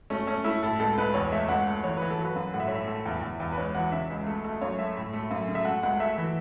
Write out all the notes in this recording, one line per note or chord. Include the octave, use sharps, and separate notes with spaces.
A3 C#4
A3 C#4
A3 E4
A2 A4
C#2 A4
C#2 B4
E2 C#5
A3 E5
C#2 F#5
A3
E3 C#5
E3 B4
A4
F#3
B4
F#2
A2 F#5
E5
C#5
A2 E5
A3
E2
E2
E2
B4
C#2 C#5
E3 F#5
C#3 E5
C#2
A3
A3
F#2 C#5
A3 E5
A2
A3
F#2
C#3
E5
A3 F#5
C#2 F#5
A3 E5
E3